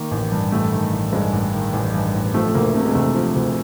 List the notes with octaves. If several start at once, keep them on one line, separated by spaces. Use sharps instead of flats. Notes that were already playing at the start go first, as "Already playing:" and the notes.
Already playing: D#3 A#3
A1
G2
A1 A3
D#3
A1
G2 G#3
A1
D#3
A1
G2
A1
F3 A3
A3
D2 A#3
C3 A3
G#3
D2 A3
F3
D2